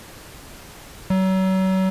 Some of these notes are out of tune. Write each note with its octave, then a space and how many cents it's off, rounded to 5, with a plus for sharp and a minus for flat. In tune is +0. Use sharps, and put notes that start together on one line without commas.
F#3 +35